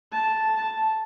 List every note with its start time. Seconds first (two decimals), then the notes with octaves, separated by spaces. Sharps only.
0.12 A5
0.56 A5